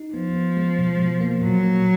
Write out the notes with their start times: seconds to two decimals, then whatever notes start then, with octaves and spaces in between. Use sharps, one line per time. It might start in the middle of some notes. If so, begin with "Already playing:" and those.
Already playing: D#4
0.14 F3 B3
0.35 B3
0.57 G#3
0.78 B2
0.99 B2
1.20 A#3
1.42 A#2 F#3
1.64 A#3